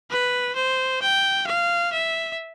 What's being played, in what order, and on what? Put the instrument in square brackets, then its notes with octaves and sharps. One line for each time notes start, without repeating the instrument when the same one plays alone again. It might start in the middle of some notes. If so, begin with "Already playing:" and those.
[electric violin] B4
C5
G5
F5
E5